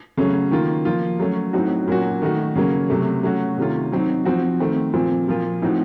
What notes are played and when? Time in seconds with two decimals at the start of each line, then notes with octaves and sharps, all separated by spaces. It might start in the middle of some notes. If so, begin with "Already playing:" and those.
0.17 C#3 F#3 A3 C#4
0.52 D#3 A#3 F4
0.85 F3 A#3 F4
1.20 F#3 A3 C#4
1.53 A2 F#3 C4 D#4 F#4
1.87 A#2 F#3 A#3 C#4 F#4
2.22 D#3 A3 D#4 F#4
2.56 C#3 F#3 A#3 C#4
2.90 C3 F#3 A3
3.23 F#3 A3 C#4 F#4
3.57 C3 D#3 A3 C#4 F4
3.92 F#3 C4 D#4
4.25 F3 C4 F#4
4.60 D#3 A3 C4
4.94 A#2 F3 C4
5.28 A#2 F3 A#3 F4
5.62 A2 F3 C4 D#4 F#4